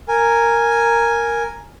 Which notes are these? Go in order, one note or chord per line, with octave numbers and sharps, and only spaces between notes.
A#4 G#5